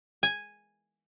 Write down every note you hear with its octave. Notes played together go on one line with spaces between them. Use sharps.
G#5